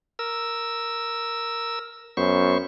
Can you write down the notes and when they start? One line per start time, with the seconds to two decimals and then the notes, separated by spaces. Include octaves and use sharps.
0.19 A#4 E6
2.17 F#2 B3 C5 C#6